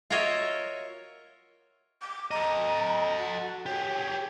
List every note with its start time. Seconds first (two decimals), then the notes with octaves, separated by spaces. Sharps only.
0.10 F4 F#4 A#4 C#5 D#5 E5
2.02 D6
2.31 A4 D#5 A#5
3.17 F#4
3.66 G4 G#4 C#5